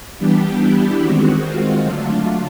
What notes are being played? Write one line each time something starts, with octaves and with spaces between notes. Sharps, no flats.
E3 G3 B3 D4 G4
E4
D#3 G#3 C4 F#4
F4
D3 F#3 A3 D4